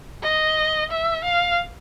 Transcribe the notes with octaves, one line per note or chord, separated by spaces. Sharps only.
D#5
E5
F5